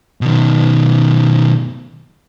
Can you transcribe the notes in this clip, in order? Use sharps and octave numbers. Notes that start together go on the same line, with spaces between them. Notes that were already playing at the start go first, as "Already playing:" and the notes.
B2 D#3